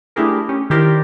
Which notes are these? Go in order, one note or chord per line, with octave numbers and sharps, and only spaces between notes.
A3 D4 E4 G4 G#4 A#4
C#4 G4
D#3 E4 G4 A#4 C5 D5